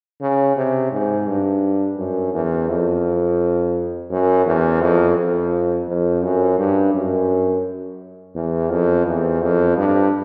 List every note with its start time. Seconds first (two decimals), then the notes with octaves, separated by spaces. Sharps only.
0.21 C#3
0.57 C3
0.92 G#2
1.27 G2
1.98 F#2
2.34 E2
2.69 F2
4.10 F#2
4.46 E2
4.81 F2
5.16 F2
5.87 F2
6.22 F#2
6.59 G2
6.94 F#2
8.35 E2
8.71 F2
9.06 E2
9.42 F2
9.77 G2